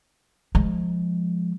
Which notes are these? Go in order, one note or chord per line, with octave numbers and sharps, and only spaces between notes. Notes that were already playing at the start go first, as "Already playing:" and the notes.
F3 G#3